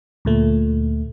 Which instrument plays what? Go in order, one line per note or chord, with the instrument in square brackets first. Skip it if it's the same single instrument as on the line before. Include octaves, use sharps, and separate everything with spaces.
[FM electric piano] D2 A#2 A3